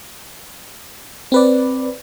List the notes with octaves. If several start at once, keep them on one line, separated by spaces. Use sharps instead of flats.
C4 B4 D5